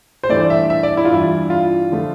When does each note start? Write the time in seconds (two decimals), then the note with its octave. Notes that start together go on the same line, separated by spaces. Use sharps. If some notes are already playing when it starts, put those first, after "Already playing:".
0.24 C5
0.29 G2 E3 A3 D5
0.50 E5
0.70 E5
0.83 D5
0.97 E4
1.05 F4
1.10 G2 E3 G3 E4
1.50 F4
1.92 D3 F3 A3